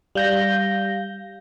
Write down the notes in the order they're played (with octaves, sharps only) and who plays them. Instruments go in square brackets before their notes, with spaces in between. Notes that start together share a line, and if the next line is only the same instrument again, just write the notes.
[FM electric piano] G3 G6 A#6 [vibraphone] F5